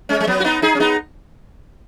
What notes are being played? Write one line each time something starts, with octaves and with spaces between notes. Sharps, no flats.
G#3 C#4
G#3
F#3 B3
F#4
B3 D#4
D#4 G#4
C#4
B3 D#4